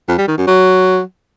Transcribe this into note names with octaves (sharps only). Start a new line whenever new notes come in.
F2
G3
D#3
F#2
F#3